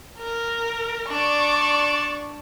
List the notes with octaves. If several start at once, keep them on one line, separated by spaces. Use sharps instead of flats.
A#4
D4 D5 C#6